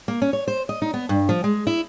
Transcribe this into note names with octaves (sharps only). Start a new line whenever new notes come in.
A#3
C#4
C#5
C5
D#5
D#4
B3
G2
F3
G#3
E4